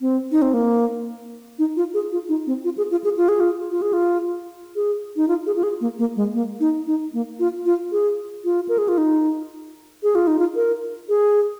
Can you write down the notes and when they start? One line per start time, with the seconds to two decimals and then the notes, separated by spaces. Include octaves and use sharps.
0.01 C4
0.32 D#4
0.42 C4
0.54 A#3
1.59 D#4
1.76 F4
1.94 G#4
2.12 F4
2.29 D#4
2.47 C4
2.64 F4
2.77 G#4
2.91 F4
3.04 G#4
3.17 F4
3.29 G#4
3.40 F4
3.70 F4
3.82 G#4
3.93 F4
4.76 G#4
5.16 D#4
5.28 F4
5.46 G#4
5.56 F4
5.63 G#4
5.81 A#3
5.99 A#3
6.16 G#3
6.34 A#3
6.60 D#4
6.87 D#4
7.13 A#3
7.39 F4
7.66 F4
7.92 G#4
8.45 F4
8.69 A#4
8.78 G#4
8.88 F4
8.98 D#4
10.03 G#4
10.15 F4
10.27 D#4
10.39 F4
10.56 A#4
11.09 G#4